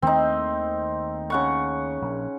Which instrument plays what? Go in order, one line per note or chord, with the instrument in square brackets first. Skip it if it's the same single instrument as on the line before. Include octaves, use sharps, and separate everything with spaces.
[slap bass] D#2 D#3 A3 [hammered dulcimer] C4 D#4
[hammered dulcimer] C#3 F#5 C#6
[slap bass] A#1